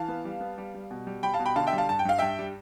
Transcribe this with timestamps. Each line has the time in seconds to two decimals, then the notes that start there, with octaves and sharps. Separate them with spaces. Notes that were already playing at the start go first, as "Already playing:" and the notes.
Already playing: E3 F5 A5
0.08 B3
0.25 G3
0.41 B3
0.58 G3
0.74 G3
0.91 B2
1.07 G3
1.23 G3 G5 B5
1.34 F5 A5
1.39 B2
1.46 G5 B5
1.56 D3 F5 A5
1.67 E5 G5
1.73 G3
1.78 F5 A5
1.89 G2 A5
1.99 G5
2.05 G2 F5
2.19 G2 E5 G5
2.39 G3